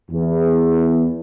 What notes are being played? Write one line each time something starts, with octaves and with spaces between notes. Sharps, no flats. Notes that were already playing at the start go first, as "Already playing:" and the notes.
E2